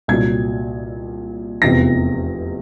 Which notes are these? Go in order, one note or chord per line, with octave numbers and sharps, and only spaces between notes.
C2 A#2 F#3 G#6
F1 E2 C3 F3 A#6